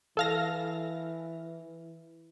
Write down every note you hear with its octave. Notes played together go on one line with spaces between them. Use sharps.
E3 A4 F5 A#6